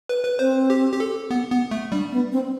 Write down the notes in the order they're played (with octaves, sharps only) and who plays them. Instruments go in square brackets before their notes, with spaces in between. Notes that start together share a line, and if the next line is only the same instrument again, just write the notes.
[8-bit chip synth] B4
B4
[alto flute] C4 [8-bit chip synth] C5
[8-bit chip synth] G4
G4
A4
B3
B3
A3
[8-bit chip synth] G3 [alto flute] D4
[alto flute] B3
C4